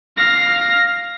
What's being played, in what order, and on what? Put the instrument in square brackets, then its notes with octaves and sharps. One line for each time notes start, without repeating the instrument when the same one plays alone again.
[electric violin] F5 A#6